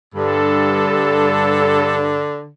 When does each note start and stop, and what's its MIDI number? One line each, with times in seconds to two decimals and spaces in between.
0.15 2.28 43
0.15 2.49 50
0.15 1.96 69